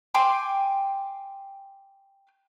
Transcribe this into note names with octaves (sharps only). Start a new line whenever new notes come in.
G5 G#5 C6 D6